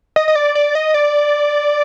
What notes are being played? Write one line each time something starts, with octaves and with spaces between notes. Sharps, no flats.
D#5
D#5
D5
D5
D#5
D5